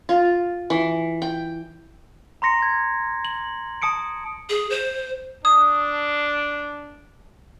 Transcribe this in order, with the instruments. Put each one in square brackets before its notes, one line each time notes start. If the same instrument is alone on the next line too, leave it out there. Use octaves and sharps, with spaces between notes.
[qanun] F4
E3
G5
[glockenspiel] A#5 C6 A#6 C#7
G#6
F#7
A5 D#6 C#7 D7
[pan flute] G#4
C5
[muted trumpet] D4 [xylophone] D#6